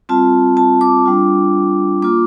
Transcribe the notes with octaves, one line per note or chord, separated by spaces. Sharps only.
G3 C4 F4 A5
A5
D6
G3 D4 F4
A#3 F4 D6